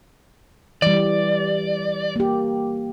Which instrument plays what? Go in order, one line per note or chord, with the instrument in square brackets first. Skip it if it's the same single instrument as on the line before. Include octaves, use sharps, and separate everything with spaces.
[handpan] E3 G3 [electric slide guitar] D5
[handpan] A#3 G4